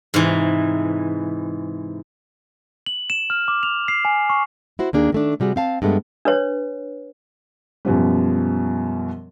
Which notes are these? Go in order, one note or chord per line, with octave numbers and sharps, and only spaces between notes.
G#2 C3 E3
F#7
E7
F6
D6
F7
C7
G#5
C#6
E4 F#4 C5
D#2 A#3 D4 G#4
D#3 A3 D4
C3 G3 F#4 G#4
C4 F5 A5
G2 G#3 A3 B3
D4 B4 C#5
F#2 B2 F3 G3